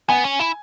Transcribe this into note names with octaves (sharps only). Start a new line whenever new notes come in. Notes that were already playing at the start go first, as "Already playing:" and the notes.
B3 G#5
C#4
E4